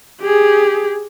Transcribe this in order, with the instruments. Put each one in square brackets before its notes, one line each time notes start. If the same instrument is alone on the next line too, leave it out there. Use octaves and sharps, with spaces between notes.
[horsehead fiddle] G4 G#4